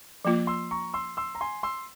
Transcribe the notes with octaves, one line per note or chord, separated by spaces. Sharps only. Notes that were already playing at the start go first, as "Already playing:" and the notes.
F3 A#3 F4
C6 E6
A#5 C#6
C6 E6
C6 E6
A#5
G#5 C6
C6 E6